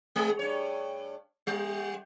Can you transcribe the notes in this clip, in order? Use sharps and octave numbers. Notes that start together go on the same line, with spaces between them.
G#3 G#4
G2 C#5
G3